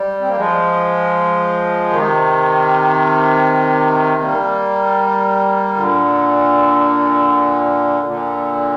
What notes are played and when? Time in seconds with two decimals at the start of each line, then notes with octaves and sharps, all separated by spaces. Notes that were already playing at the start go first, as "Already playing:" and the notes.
Already playing: G3
0.21 C4
0.28 A#3
0.37 F3 G#3
1.90 C3 D#3
4.21 G3 A#3
5.75 A#2 D3
8.06 A#2 D3